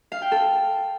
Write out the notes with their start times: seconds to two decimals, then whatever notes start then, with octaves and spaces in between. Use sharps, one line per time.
0.12 F5
0.22 G5
0.32 A4